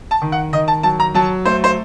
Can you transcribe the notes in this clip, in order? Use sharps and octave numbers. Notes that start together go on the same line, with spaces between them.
A5
D#3
F#5
D#3 D#5
A5
F#3 A5
A#5
F#3 A5
A3 C5
C5